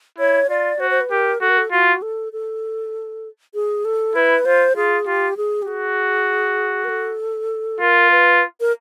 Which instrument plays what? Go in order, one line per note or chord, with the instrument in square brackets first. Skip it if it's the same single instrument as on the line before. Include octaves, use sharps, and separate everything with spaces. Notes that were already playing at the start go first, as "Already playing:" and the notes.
[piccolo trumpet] E4 [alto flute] C#5
[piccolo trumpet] F4 [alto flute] D5
[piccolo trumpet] F#4 [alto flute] C5
[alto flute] C5
B4
[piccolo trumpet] G4 [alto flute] A#4
[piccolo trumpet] F#4 [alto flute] A4
[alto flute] A#4
A4
[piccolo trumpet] F4 [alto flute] F#4
[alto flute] A4
A4
G#4
A4
[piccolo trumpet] E4 [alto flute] B4
[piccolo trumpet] F4 [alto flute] C5
[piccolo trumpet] F4 [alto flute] G#4
[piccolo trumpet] F4 [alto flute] G4
[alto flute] G#4
G4
[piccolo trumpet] F#4 [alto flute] G#4
[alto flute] A#4
A4
[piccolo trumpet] F4 [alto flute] A#4
[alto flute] B4
A#4